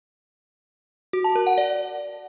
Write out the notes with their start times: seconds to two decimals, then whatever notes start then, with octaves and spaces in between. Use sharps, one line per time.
1.13 F#4
1.24 A5
1.35 A#4
1.47 F#5
1.58 D5